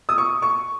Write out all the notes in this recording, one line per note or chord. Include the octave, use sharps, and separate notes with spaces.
D#6
C#6
C#6